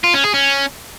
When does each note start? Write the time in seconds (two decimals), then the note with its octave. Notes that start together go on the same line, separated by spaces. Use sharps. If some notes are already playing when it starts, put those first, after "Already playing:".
0.04 F4
0.14 C#4
0.24 G#4
0.34 C#4